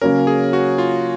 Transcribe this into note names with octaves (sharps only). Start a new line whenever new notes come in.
C#3 F#3 A#3 C#4 A#4
G#4
F#4
F4